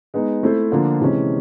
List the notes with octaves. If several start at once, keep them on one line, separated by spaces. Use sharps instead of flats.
G#3 B3 D#4
A3 C4 E4 A4 C5
D3 F3 A#3 D4 F4
C3 E3 G#3 C#4